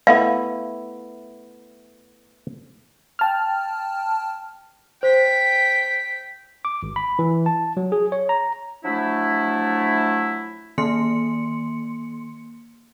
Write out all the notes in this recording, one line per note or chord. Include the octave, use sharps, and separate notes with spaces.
A3 B3 E4 F5
G5 A5 F6
C5 G5 B6
D6
G#1
B5
E3
A5
F#3
G#4
C#5
A#5
F3 F#3 A3 D4 E4
D#3 A#3 C6 C#7